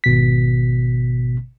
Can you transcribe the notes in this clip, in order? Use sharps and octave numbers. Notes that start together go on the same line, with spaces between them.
G#1 B2 B6